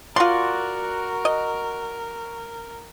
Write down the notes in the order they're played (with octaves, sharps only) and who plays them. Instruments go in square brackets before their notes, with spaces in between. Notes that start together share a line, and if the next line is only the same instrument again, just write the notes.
[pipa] F4 C6 [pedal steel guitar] F#4 D5 [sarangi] A#4
[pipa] D#5